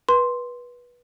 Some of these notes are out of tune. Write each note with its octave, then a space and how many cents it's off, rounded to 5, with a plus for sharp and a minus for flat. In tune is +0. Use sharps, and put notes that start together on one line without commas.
B4 -20 C6 +0